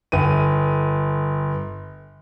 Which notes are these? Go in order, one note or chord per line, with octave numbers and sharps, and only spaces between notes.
G1 D#7